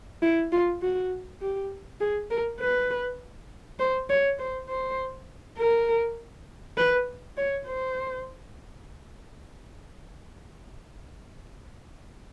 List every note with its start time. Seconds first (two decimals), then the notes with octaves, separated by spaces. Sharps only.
0.22 E4
0.52 F4
0.82 F#4
1.42 G4
2.01 G#4
2.31 A#4
2.60 B4
3.79 C5
4.10 C#5
4.39 C5
4.68 C5
5.58 A#4
6.78 B4
7.37 C#5
7.67 C5